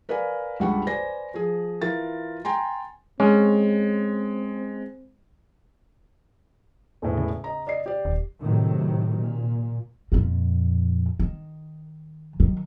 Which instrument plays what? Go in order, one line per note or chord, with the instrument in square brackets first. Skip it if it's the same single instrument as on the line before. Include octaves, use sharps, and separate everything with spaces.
[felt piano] A#4 B4 D5 F5 G#5
C#2 G2 G3 F#5 B5 C#6
B4 C5 D5 G#5 A#6
F3 G#4
E3 F4 A#4 A6
G5 G#5 A#5 C6
[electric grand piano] G#3 [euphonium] C4 [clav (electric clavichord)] C#4
[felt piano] E1 A2 B4
[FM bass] C#3
[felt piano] D#5 A#5
D5 D#5 C7
G4 D5
[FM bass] D#1
[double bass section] A2 C3 D#3 F#3
A#2
[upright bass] F2 A#2
D#3
D#3 F#3